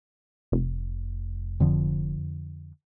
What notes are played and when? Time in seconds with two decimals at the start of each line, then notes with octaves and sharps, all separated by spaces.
0.52 F1
1.60 F2 D3 F3